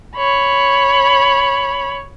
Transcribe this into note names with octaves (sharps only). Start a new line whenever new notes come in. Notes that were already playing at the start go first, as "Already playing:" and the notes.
C#5 B5